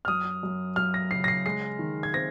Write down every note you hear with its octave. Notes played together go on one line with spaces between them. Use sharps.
F6
F#2 D#6
F#2
F#2 F6
A#6
C#3 C7
A#6
C7
G#3 C7
D#3
G#6
C4 A#6